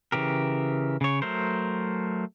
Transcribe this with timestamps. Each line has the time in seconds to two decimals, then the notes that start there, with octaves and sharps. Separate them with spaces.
0.12 C#3 E3 G4 A#4
1.01 C#3 C#5
1.22 F#3 A3 A#4 C5